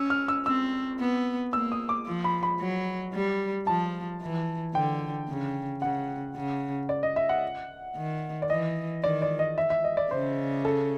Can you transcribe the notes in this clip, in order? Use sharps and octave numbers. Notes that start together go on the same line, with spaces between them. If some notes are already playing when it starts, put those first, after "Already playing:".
Already playing: C#4 E6
F6
E6
C4 E6
B3
A#3 E6
D#6
D6
F3
B5
B5
F#3
G3
F3 A5
E3
D3 G5
C#3
C#3 F#5
C#3
D5
D#5
E5
F#5
D#3
D5
E3 D#5
D#3 D5
D5
D#5
E5
E5
D#5
D5
C#3 C5
A4